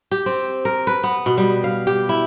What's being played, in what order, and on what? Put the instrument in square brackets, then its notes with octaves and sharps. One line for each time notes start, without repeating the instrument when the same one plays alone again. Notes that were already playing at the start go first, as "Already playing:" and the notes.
[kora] G4
C4
A#4
B4
B3
B2
G3
F5
G4
E4